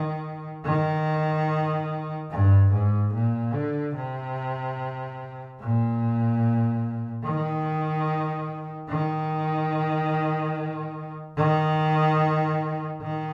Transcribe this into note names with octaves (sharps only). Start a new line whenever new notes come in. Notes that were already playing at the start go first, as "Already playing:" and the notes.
Already playing: D#3
D#3
G2
G#2
A#2
D3
C3
A#2
D#3
D#3
D#3
D#3